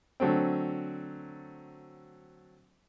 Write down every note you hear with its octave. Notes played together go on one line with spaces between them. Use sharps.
D3 F#3 A3 C4